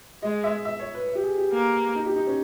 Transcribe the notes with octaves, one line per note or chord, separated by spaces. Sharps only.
G#3 D#5
E5
E5
C#5
B4
G4
G#4
G4
A#3
D#4
G4
D#4
C#4